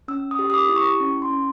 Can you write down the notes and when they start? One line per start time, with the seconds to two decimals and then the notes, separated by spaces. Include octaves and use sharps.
0.08 C#4 E6
0.31 D#6
0.39 G4
0.50 D#6
0.54 D6
0.69 E4
0.76 C#6
1.00 C#4
1.22 C6
1.30 C#4